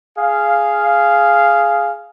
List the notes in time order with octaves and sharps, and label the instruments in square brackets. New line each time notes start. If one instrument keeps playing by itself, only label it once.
[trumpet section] G#4 F5